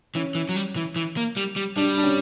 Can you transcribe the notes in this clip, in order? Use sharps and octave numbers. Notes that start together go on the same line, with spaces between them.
E3 C#4
E3
F#3
G3
E3
E3
A#3
G3
G3
G3 D4
D4
C#4